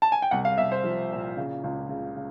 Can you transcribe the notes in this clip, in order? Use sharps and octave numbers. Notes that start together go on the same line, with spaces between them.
A5
G#5
G5
C2 F#5
F5
C2 E5
C5
F3
A#2
C#3
C#2
C#3
C#3